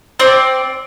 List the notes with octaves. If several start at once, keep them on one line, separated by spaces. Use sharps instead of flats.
C4 D5